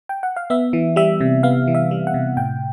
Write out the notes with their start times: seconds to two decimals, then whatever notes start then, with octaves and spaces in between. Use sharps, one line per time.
0.09 G5
0.23 F#5
0.36 F5
0.50 B3 E5
0.73 E3
0.96 G3 E5
1.21 C3
1.43 B3 F5
1.67 E3
1.75 E5
1.91 G3
2.07 F#5
2.14 C3
2.37 A2 G5